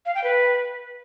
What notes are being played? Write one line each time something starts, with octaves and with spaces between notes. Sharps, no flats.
F5
G5
B4